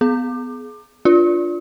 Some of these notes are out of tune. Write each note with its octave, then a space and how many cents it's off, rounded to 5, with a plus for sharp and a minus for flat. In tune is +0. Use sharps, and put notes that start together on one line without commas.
B3 +20 G#4 +30 D6 +25
D4 +0 F4 +0